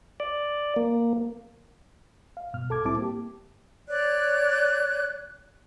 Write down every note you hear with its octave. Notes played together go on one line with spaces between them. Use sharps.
D5
A#3
F5
G2 B2 F6
C2 A4 A5 D6 G#6
A2 G3 C4 E4 A5 D6
A#3 G4
C#5 D5 F#6